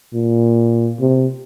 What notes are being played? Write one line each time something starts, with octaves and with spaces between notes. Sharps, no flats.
A#2
C3